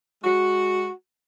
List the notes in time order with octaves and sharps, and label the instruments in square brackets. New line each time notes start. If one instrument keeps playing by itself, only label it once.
[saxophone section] G#3 F#4